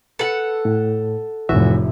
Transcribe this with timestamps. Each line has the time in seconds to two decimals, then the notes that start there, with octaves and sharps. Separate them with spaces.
0.19 A4 B4 F#5
0.65 A2
1.49 F1 A2 E3 F#4 E5